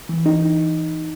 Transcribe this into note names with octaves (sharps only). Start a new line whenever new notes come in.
E3
D#4
D#4